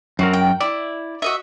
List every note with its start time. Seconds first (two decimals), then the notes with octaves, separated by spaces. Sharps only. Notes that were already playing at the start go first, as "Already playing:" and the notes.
0.19 F#2 C4 F#4 A#4
0.33 G5
0.61 E4 D5
1.22 F#4 D#5 E5